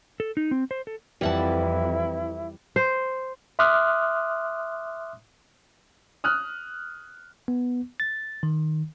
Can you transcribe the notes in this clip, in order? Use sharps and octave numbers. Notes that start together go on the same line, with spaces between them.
A4
D#4
C4
C5
A4
F2 E3 G3 E4 F#5 A5
C5
E5 C6 D6 D#6 F6 F#6
D#6 F6 F#6
B3
A6
D#3